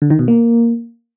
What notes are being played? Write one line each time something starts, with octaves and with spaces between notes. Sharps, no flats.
D3
D#3
B2
A#3